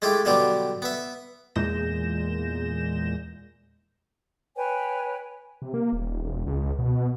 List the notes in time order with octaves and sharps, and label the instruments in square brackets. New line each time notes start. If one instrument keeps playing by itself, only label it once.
[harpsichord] G#3 A3 E4 F4 G4
B2 D3 F#3 G3 F4 G4
B3 E5
[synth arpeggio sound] E2 A#2 G#3 G6 A#6 E7
[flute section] B4 C#5 G5 G#5
[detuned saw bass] C3
A#3
D#1
E1
C#2
B2